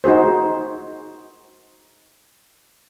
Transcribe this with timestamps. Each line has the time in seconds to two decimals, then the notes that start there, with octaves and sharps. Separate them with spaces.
0.04 D#4 F#4 G#4 C5